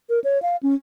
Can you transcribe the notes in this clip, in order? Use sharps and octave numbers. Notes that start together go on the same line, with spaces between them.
A#4
C#5
F5
C#4